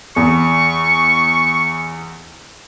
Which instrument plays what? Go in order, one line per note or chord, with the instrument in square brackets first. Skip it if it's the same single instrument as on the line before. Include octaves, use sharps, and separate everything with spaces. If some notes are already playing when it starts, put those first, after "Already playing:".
[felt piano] E2 [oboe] C#6